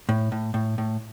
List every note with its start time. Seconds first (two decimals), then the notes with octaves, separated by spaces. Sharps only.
0.09 A2
0.32 A2
0.54 A2
0.78 A2